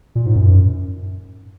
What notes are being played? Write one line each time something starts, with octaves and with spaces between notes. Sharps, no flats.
A#2
G#2
F#2